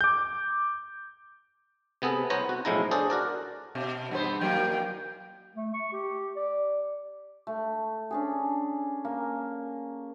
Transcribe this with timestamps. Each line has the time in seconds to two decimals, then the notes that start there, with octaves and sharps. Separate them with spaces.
0.01 D6 G6
2.02 C3 B3 G#4 A4
2.30 C2 B3 C5 C#5 A#5
2.49 F#4
2.65 B1 A2 F3 G#3 E4 A#5
2.91 D4 G#4 A4 C5 C#5
3.10 F#4 A#4 D5
3.75 B2
4.11 G2 B3 C5
4.41 F#3 A#3 G5
5.56 A3
5.74 C#6
5.93 G4
6.36 D5
7.47 A3
8.11 C#4 D4 G#4
9.05 A#3